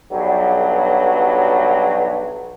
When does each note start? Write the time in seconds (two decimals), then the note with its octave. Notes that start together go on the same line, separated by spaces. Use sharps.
0.12 B1 G2 F#3